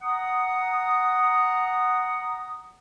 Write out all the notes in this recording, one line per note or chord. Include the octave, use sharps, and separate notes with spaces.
F#5 A#5 D#6